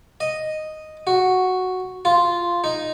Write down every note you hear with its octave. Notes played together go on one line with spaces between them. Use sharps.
D#5
F#4
F4
D#4